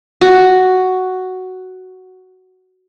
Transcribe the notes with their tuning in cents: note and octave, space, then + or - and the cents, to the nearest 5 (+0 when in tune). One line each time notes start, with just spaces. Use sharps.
F#4 +5